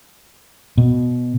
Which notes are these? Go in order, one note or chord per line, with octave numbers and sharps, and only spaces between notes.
B2